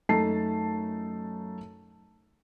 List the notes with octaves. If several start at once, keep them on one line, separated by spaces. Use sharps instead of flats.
F#2 A3 D#4 A5 C7